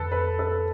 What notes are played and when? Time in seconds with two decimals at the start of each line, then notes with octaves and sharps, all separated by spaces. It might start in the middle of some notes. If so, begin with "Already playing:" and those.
Already playing: F2 D3 A4 B4
0.12 B4
0.39 A4